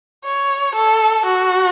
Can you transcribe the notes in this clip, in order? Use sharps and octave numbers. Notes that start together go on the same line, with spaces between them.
C#5
A4
F#4